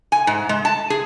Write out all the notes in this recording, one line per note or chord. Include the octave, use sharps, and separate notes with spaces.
G#5
G#2
G#3
A5
G#4